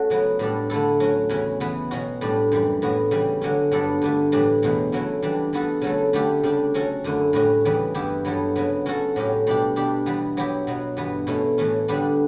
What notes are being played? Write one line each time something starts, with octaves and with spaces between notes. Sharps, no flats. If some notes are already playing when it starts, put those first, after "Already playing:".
Already playing: A3 C#4 F#4
C#3 F#3 B3
A2 G3 D4 A4
D3 A3 E4 A4
F#3 C#4 F#4
E2 C#3 F#3 C#4
C#3 E3 B3
B2 F#3 C#4 F#4
A2 G3 D4
F#2 E3 G3
A2 E3 B3 F#4
C#3 E3 G3
D3 F#3 A3 C#4
G2 F#3 B3 D4 A4
G2 D3 A3
A2 E3 G3 D4
E2 B2 F#3 A3
C#3 F#3 A3 E4
E3 G3 D4
E3 B3 F#4 A4
C#3 F#3 A3 E4 A4
D3 A3 E4 G4
C#3 G3 D4 G4
F#3 C#4 F#4 A4
F#2 D3 A3 C#4 E4
A2 G3 C#4 F#4
E2 C#3 E3 G3 B3
G2 E3 B3 E4 G4
G2 F#3 B3 E4 A4
C#3 F#3 B3
F#3 C#4 F#4 A4
A2 F#3 C#4 G4
B2 G3 D4 G4
B2 G3 D4 G4
E3 G3 B3
F#3 B3 E4 G4
B2 F#3 B3
G2 E3 B3
B2 A3 C#4 E4
A2 E3 A3 C#4
D3 G3 B3 D4